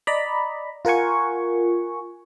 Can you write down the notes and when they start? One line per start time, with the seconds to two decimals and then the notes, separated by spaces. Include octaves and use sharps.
0.07 D5 D#5 A#5 B5
0.85 F4 A#4 F#5 G#5 C#6